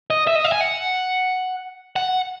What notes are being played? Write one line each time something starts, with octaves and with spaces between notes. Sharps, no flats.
D#5
E5
D#5
E5
G#5
F#5
F#5